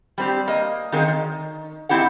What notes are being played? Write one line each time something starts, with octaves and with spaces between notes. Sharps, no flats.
G3 C4 G4
A#3 D#5
D#3 F#3 G#3 A#3 C4
D#3
G#2 C4 E4 G4 F#5